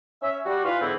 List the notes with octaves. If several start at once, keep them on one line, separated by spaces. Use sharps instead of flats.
C#4 E5
G3 F#4
E3 F4 B4
G#2 D3 E3 B3 C4 E4